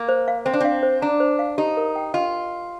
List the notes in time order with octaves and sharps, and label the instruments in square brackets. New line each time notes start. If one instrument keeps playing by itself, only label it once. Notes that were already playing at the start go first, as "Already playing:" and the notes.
Already playing: [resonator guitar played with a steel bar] A#3
[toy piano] C5
F5
[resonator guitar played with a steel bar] C4 [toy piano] C5
[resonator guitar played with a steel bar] D4
[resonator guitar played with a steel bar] C4 [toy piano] F5
[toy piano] C5
[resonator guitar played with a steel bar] D4 [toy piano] A#5
[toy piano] C5
F5
[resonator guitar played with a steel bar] D#4 [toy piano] G4
[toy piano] A#4
G5
[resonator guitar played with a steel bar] F4 [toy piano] D#5